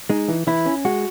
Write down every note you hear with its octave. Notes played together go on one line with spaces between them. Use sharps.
G#3 D#4
E3
E3 E4
C#4
G#3 F#4